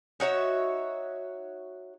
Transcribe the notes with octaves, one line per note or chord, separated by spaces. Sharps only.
D#4 F#4 C#5 E5